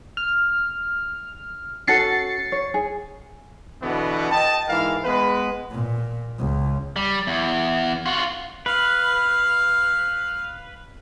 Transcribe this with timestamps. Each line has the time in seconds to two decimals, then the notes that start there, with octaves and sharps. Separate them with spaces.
0.17 F6
1.87 C#4 F#4 A4 A6 C7 C#7
2.52 C#5
2.74 G#4
3.82 B2 D3 E3 B3
4.31 D#5 G5 A5
4.69 G#2 E3 A#4 F5
5.05 G#3 B3 B4
5.72 A#2
6.40 C#2
6.96 G3
7.27 E2
8.06 F4 F#4
8.66 B4 F5